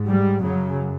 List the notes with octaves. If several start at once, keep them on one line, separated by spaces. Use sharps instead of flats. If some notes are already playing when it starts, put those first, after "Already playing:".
Already playing: G#2
G3
F#2 C#3 F#3